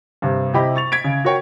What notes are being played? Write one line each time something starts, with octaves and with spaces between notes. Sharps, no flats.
G2 C3
C3 E4 G4 D#5 B5
C#6 A6 F7
G#6 B6 D7
C#3
F#4 A#4 C#5 G5